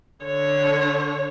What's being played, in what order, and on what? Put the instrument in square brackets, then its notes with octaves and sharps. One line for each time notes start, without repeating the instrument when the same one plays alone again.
[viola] D3 C#5